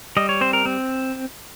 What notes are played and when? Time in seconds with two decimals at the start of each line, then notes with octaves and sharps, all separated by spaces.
0.17 G3 D#5
0.29 C#5
0.41 C4 C5
0.53 A#4
0.66 C4